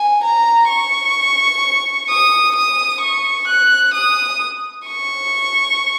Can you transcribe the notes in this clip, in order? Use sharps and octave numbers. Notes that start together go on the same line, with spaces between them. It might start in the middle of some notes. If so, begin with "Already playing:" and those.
Already playing: G#5
A#5
C#6
D#6
D#6
C#6
F#6
D#6
C#6